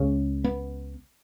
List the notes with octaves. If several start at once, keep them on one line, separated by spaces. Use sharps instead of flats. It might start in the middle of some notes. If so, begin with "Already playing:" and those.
Already playing: C#2 C#3
B3